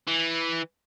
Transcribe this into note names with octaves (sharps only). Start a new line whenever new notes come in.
E3